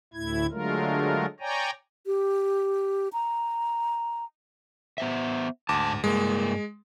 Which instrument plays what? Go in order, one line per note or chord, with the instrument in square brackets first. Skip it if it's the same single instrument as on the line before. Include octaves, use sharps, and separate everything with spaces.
[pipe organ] D2 A2 E4 G#6
D3 F#3 G#3 A3 F4 A#4
C#5 D5 G5 G#5 A#5
[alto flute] G4
A#5
[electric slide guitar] B3 C5 E5
[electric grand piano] D2 D6 [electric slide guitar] G#2 A5
[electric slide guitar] G2 A#3 [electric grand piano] G#3